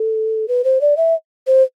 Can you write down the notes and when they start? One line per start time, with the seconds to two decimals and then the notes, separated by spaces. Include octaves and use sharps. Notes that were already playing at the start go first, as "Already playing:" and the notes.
Already playing: A4
0.48 B4
0.64 C5
0.81 D5
0.97 E5
1.47 C5